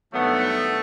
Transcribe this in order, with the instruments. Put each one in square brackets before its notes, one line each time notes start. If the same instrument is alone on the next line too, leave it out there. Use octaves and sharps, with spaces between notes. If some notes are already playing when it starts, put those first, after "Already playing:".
[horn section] G2 D#3 F#3 B3 [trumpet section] A3